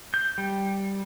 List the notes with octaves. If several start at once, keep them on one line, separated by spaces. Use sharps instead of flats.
G6
G3